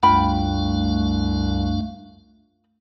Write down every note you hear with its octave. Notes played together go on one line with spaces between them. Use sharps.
C2 F#2 A3 D4 F4 F5 G5 B5